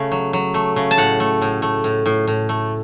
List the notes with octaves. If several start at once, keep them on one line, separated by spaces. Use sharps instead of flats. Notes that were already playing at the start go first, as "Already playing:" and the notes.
Already playing: C#3 A3
F#3
F#3
A3
C#3
A5
A2 F#5
A3
A2
A3
A2
A2
A2
A3